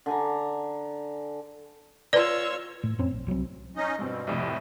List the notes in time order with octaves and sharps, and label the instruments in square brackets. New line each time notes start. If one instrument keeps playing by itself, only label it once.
[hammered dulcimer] D3 G#5 A#5
[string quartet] F4 C#5 E6 [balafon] B4 D5
[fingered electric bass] A2
F2 C4 C#4
A#1
C2 F#3 G#3 C4
[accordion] C#4 D#4 D#5
[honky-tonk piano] G2 C4 [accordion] B2
[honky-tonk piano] C2 F2 A2